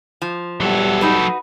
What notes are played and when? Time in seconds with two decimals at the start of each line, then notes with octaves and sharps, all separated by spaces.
0.22 F3
0.61 E2 F#3 G3 A4
1.01 D#4 F#4 B4